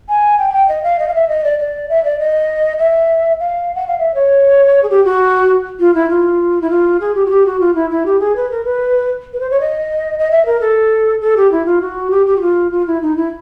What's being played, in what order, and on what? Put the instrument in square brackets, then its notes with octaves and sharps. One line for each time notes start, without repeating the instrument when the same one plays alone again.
[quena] G#5
G5
G#5
G5
D#5
F5
D#5
F5
E5
D#5
D5
D5
E5
D5
D#5
E5
F5
F#5
F5
E5
C#5
G#4
G4
F#4
F4
E4
F4
E4
F4
G#4
G4
F#4
G4
F#4
F4
E4
E4
G4
G#4
B4
A#4
B4
B4
C5
C#5
D#5
D#5
E5
A#4
A4
A4
G4
E4
F4
F#4
G4
G4
F#4
F4
F4
E4
D#4
E4